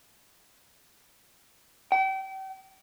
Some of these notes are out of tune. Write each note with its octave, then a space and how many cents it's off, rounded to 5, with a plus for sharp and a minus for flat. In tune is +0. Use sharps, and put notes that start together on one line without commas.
G5 -35